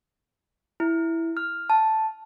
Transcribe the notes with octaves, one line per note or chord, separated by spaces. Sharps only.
E4
F6
A5